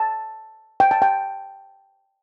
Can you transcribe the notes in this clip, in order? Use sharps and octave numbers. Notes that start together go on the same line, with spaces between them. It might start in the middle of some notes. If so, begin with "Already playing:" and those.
Already playing: A5
G5
A5
G5